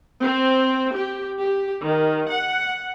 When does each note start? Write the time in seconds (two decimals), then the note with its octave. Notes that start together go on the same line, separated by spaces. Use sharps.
0.19 C4
0.93 G4
1.39 G4
1.84 D#3
2.32 F#5